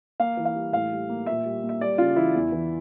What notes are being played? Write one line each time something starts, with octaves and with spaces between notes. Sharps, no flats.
A#3 F5
E3
F5
G3
A2 F5
G3
A#3
A#2 E5
G3
A#3
E5
G3 D5
C#3 F4
E3 E4
E2
E3